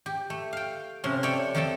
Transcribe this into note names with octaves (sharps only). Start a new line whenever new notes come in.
G4
A3
F5 G5
C3 F3 C#4
A4 C#5 D5 E5 G5
F2 F3 A3 A4 G5 A5